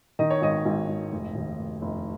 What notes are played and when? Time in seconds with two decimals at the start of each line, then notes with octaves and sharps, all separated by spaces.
0.19 D#3 D#5
0.30 C#5
0.42 G#1 D#5
0.65 G#1
0.89 G#1
1.12 F1
1.35 D#2
1.59 F1
1.82 F1